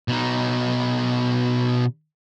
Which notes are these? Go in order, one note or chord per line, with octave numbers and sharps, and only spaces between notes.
B2 D#4